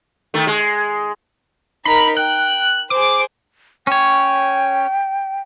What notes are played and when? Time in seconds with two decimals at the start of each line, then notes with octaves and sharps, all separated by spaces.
0.34 D#3 A3
0.47 G#3
1.85 D#4 A#4 B5
2.17 G5 F#6
2.90 G#4 C5 D6
3.87 C#4 C#5 G5